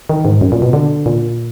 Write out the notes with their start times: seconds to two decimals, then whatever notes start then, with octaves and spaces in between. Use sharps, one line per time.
0.09 D#3
0.25 G#2
0.41 F#2
0.52 A#2
0.62 B2
0.73 D3
1.06 A#2